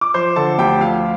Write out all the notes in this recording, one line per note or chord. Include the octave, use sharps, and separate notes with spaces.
D6
F3 C5 C6
D3 A4 A5
D2 G4 G5
F3 F4 F5